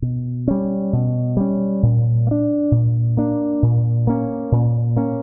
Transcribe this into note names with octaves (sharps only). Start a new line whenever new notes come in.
B2
G3 C#4
B2
G3 C#4
A#2
A#3
D4
A#2
A#3 D4
A#2
A#3 C#4
A#2
A#3 C#4